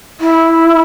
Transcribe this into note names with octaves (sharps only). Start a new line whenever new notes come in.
E4